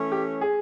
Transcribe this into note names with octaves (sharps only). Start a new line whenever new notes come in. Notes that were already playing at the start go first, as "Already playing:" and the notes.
Already playing: E3 A3 C#4
G4
G#4